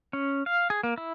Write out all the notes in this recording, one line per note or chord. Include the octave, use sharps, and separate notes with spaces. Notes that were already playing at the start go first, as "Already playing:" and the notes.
C#4
F5
G#4
A#3
E4